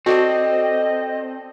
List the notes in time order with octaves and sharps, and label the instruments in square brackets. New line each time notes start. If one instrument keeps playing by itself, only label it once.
[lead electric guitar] C4 [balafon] F#4 [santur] A4 D5 A5 [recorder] D#5